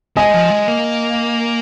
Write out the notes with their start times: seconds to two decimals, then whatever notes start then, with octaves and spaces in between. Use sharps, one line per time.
0.17 G#3 D#5 G#5
0.34 F3
0.51 G#3
0.68 A#3